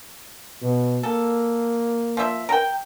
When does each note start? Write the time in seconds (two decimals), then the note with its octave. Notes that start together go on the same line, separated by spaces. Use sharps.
0.62 B2
1.03 A#3 A4
2.17 F3 E5
2.49 A#4 G5